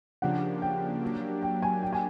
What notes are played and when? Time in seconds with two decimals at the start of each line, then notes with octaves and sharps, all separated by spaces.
0.22 C#3 F3 A#3 D4 G4 F#5
0.62 G5
1.03 F#3 A#3 D4 G4
1.42 G5
1.62 G#5
1.83 G5
1.93 G#5